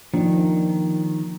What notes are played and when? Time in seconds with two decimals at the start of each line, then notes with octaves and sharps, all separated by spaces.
0.14 D#3 F3 A#3 D4